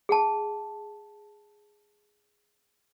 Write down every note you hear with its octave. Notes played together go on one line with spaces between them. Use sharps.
G#4 F#5 A5